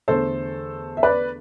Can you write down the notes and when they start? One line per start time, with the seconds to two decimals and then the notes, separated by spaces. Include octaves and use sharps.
0.08 E2 D3 A3 A4 C5
0.97 E5
1.03 B4 D5